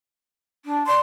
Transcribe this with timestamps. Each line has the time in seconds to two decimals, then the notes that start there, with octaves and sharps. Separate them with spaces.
0.65 D4
0.87 D5 C6